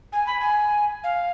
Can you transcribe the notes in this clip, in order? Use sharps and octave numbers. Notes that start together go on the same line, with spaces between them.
G#5
B5
G#5
F5